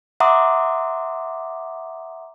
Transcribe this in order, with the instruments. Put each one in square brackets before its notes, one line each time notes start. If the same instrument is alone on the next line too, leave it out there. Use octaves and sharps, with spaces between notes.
[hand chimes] E5 F#5 A#5 C6 D6 D#6